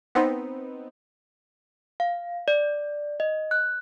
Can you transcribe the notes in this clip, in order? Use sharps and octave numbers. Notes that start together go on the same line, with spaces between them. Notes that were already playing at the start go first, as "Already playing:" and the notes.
B3 C4 D#4
F5
D5
D#5
F#6